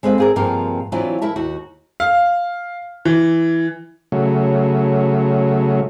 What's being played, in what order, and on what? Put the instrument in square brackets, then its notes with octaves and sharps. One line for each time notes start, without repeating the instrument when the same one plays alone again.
[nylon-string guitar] G#3 C4 A4 B4 D5 F5
C4 G#4 A#4
G2 C3 F3 A#3 G#4 A#4
E3 F#3 C4 D4 E4 F4
E4 A#4 E5 A5
D#2 F#4
[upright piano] F5
E3
[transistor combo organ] C#3 F#3 A3